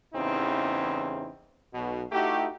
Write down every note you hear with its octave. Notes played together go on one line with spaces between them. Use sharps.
A1 E2 C#3 C4 D#4 E4
B1 B2
A3 D#4 E4 F#4 G4